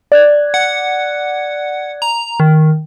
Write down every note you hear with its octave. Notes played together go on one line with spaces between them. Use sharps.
D5 F#6 G#6
F#5
A#5
D#3